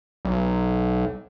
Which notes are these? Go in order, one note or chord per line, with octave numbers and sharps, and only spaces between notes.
B1